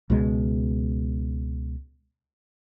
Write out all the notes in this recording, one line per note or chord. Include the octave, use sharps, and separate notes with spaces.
C#2 B2 G#3